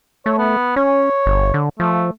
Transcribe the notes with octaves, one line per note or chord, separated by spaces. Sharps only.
A3 C#5
B3
C#4 C#5
G1
D3
F3 A3